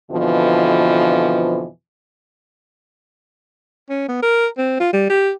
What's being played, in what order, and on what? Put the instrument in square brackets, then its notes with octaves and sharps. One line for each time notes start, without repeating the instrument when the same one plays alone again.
[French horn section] F2 B2 D3 E3 F3
[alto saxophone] C#4
B3
A#4
C4
F4
G3
G4